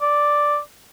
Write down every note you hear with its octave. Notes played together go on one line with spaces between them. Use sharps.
D5